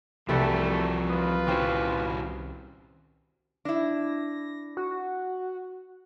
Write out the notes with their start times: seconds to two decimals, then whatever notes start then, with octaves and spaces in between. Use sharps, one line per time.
0.29 C2 E3 F3 G3 A3 F#4 A4 D5
1.09 F4 B4 A#5 D#6
1.47 D#3 C4 C#4 E4 F#4 G5 D6 F6
3.65 D4 E4 A#6
4.77 F#4